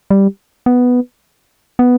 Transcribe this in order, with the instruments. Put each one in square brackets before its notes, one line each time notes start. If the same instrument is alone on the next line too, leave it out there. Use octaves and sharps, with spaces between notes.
[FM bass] G3
B3
B3